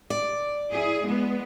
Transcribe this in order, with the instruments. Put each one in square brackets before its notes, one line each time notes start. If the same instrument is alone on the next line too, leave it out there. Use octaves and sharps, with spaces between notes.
[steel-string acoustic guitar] D5
[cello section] E4 G#4
G#3 B3